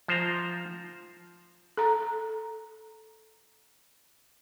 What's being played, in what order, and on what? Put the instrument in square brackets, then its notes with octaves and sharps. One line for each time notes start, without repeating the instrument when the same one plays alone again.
[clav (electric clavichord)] F3 C5 A#5
[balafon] A4 A#5